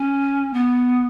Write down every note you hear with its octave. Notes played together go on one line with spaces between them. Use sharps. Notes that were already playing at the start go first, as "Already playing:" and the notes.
Already playing: C#4
B3